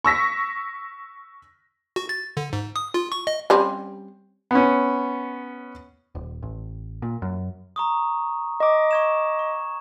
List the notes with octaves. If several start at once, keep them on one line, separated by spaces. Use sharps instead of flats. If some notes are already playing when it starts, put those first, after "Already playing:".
C#6 E6 A#6 B6
F#4
A6
D3
G#2
D#6
F4
C#6
D#5
G3 C4 C#4
B3 C#4
D#1
A1
A#2
F#2
A#5 C#6 D#6
D#5 D6
C#6 G#6 E7
C#6